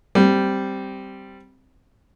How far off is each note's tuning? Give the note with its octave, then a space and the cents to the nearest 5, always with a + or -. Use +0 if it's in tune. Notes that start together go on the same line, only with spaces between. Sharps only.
G3 +0 C4 +0